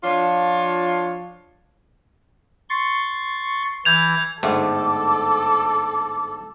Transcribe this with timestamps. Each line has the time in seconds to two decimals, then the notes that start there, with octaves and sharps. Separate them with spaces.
0.03 F3 D4 F4 C#5
2.69 C6 C#6 A6
3.85 E3 G6 G#6 F7
4.43 G1 G#2 A3 A4 D6